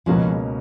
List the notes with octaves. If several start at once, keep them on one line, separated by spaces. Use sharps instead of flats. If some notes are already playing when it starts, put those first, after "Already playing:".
C#2 B2 F3 G#3 A#3 C#4